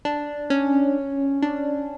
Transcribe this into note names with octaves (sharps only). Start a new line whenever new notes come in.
D4
C#4
D4